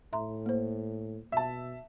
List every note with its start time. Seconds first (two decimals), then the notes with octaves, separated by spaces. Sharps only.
0.13 A2 E5 A#5 C6
0.46 A#3 C5
1.32 B2 E5 A5